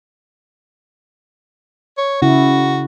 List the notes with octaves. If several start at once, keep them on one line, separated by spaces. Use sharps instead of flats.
C#5
C#3 E4 F#4